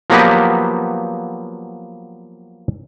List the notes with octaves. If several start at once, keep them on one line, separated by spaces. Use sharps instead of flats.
F3 F#3 A#3 B3 G4 B4